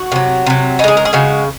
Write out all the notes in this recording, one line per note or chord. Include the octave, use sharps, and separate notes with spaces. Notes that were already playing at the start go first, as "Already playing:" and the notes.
Already playing: F#4
C3 F#3
C3 F#3
C#3 G#3 D#4 G#4
A#4
G#4
C#3 G#3 F#4